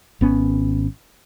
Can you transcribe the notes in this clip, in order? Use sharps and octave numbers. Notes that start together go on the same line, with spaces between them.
G#1 B3 C#4